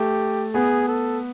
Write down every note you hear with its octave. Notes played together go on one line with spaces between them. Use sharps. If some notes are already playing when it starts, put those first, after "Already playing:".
Already playing: A3 G4
B3 G#4
A4